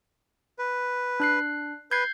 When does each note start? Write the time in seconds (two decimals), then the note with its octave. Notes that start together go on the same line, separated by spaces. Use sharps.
0.59 B4
1.20 D4 F#6 C7
1.91 B4 G6 G#6 C7